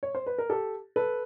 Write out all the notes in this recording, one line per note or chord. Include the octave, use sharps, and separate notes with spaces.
C#5
C5
B4
A#4
G4 A4
A4 B4